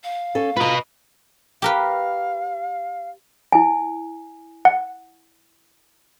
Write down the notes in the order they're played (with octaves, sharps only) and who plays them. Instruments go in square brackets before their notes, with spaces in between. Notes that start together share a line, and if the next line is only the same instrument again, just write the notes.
[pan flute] F5
[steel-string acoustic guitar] C#4 A4
[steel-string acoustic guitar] F4 A#5 [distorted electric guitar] B4 D#5
[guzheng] G4 A#4 B4 [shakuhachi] F5
[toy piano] E4 G#5
[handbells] F#5